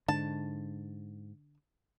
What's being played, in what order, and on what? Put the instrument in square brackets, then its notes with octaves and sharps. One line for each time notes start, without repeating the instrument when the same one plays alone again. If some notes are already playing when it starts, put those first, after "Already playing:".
[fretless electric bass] G#2 [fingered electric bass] D3 [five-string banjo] A5